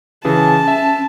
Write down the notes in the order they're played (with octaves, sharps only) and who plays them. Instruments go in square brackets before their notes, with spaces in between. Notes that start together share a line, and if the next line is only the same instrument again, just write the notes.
[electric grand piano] C#3 E3 G#4 [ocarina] C#4 [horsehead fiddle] A5
[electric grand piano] E5